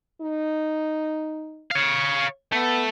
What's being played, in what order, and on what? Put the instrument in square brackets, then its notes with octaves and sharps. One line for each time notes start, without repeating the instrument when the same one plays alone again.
[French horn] D#4
[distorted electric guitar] C#5 F5
[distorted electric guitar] A3 [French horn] B3